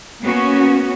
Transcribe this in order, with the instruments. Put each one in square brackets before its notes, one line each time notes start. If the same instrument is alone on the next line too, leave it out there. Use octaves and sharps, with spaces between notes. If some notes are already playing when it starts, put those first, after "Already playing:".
[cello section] A#3 B3 C#4 F#4